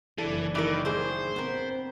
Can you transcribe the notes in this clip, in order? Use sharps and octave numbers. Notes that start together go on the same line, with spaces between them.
F#1 E3 D4 A4
D#3 E3 E4 A#4
A2 G#4 C5
B3 C4 A#4